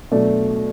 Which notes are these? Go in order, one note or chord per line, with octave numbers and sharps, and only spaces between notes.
B2 F#3 A3 D4